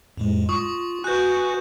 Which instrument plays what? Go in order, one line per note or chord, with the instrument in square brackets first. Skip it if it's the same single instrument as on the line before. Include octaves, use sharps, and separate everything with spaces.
[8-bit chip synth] F2 A2 G#3
[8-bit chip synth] F4 [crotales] C#6 D#6
[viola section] F#4 [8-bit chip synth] B4 G#5 [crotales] F#6 G6